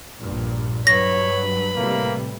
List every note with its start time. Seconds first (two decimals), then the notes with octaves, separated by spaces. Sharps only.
0.20 A#1 G2 A#2
0.87 G2 F#3 B4 C#5 B5 A#6
1.76 A2 C3 G3 A#3